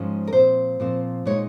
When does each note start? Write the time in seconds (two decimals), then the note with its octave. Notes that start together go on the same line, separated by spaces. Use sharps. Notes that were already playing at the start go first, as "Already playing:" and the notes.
Already playing: G#2 F3 G#3 C#4
0.27 A#4
0.32 A#2 F3 C4 C5
0.80 A#2 F3 C4
1.25 A#2 G#3 D#4 C#5